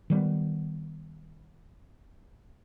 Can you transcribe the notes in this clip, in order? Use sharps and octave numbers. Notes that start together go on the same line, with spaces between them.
D#3 G3 A3 B3